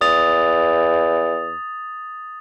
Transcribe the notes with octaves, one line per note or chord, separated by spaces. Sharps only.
E2 D#6 A6 F7